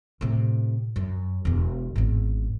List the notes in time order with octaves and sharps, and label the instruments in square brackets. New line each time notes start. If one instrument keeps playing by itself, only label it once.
[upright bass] A2 C3
F#2
E1 E2
G#1 E2